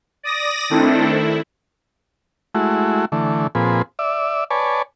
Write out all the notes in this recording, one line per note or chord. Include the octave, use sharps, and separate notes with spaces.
D5 D#6 A#6
D#3 A3 C4 D4 E4 A4
E4
G#3 A3 E4 F#4
D3 E3 A3
A#2 F3 C4 G#4 B4
D5 E5
B4 C#5 D5 G#5 A5